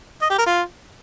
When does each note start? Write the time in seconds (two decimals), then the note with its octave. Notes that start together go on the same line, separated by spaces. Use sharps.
0.21 D#5
0.30 G4
0.38 A#4
0.46 F4